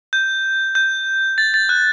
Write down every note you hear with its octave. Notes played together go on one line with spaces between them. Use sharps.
G6
G6
A6
A6
F#6